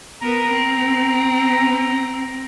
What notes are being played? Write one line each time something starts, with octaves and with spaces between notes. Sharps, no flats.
B3 A#4 A#5
C4